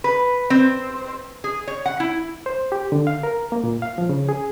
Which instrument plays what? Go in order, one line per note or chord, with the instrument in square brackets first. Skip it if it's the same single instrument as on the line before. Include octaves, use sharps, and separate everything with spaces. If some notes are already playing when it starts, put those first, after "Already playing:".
[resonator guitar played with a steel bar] B4
C4
G#4
C#5
F#5
E4
[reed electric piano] C5
G4
D3
F5
A#4
A#3
A#2
F5
F3
C#3
G#4